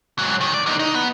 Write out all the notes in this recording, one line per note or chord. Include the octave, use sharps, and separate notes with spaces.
G#2 F#3
D#3
D5
D3 D#4
D#4
B3